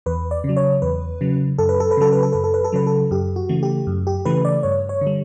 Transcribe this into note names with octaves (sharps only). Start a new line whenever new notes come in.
E2 B4
D5
C#3
F#3
C#5
E2 B4
C#3 F#3
F#2 A4
B4
A4
B4
C#3 F#3 A4
B4
A4
F#2 B4
A4
B4
A4
C#3 F#3 B4
A4
F#2 G4
F#4
C#3 E3 A3
G4
F#2
G4
C#3 E3 A3 B4
D5
G2 C#5
C#5
D3
G3